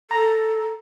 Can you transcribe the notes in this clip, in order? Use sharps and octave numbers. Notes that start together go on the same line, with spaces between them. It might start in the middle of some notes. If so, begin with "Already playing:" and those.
A4 A#5